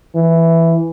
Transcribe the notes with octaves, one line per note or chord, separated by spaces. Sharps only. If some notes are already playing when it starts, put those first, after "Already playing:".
E3